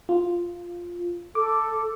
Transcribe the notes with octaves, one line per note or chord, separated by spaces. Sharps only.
F4
A4 D6